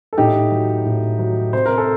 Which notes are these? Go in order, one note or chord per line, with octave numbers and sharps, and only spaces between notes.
A4
A2 D#4 G4
F#3
A2
F#3
C3 C5
A#4
A4